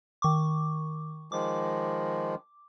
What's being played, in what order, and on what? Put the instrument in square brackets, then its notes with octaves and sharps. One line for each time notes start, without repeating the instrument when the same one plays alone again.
[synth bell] D#3 C#6 D6
[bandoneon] D#3 F3 G#3 [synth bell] D6